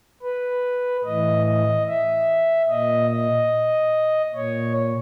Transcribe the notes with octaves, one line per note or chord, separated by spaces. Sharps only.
B4
A2 E3 D#5
D#5
E5
A#2 D#5
D#5
A#2 C#5